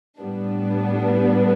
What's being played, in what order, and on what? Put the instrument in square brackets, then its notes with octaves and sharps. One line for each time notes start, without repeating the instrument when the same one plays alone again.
[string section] A2 G3 B3 D4